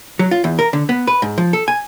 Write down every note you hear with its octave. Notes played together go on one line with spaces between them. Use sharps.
F#3
F4
E2
A#4
D3
B3
B4
G#2
F3
A4
G#5